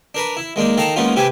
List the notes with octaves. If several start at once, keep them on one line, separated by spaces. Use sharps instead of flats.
D4 A#4 B4
E4
G#3 A#3 D4 D#4
D#3 A4 F5 A5 A#5 C#6
G#3 A#3 B3 C#4 D#4 F4
C3 E4 G4 B4 G#5